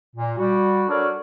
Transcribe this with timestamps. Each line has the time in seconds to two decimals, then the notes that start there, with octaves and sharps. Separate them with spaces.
0.16 A#2
0.38 G3 F#4
0.89 D4 F#4 A4 A#4 C#5 D5